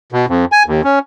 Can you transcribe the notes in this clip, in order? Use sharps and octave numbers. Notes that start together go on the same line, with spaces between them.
B2
F2
G#5
D#2
C#4